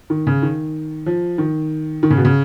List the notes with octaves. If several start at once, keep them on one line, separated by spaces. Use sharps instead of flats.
D#3
C#3
D#3
F3
D#3
D#3
C#3
B2
C#3